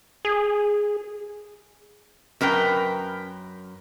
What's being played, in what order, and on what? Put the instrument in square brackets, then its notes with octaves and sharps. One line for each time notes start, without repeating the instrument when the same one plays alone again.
[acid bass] G#4
[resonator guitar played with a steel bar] F#2 A#4 B4 G5